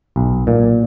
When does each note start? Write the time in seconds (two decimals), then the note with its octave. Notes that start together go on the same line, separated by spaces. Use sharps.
0.16 B1
0.47 A#2